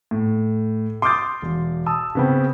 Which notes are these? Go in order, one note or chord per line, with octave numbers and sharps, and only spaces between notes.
A2
C6 D6 D#6 F6 G6 A6
E1
A5 D#6 E6
C#3 B3 C4